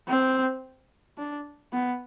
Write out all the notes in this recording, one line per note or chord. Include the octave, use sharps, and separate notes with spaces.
C4
D4
B3